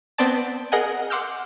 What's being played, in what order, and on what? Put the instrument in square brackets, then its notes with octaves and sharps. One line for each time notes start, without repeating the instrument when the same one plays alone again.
[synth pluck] B3 C4 D5 A5
G#4 A#4 D#5 F#5 G#5
F#5 C6 D6 E6 F6 G6